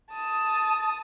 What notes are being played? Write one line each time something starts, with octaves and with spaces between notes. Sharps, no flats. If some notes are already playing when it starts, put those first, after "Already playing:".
A5 D#6